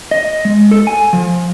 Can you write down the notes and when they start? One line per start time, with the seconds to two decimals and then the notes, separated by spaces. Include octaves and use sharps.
0.11 D#5
0.45 G#3
0.71 A4
0.87 G#5
1.13 F3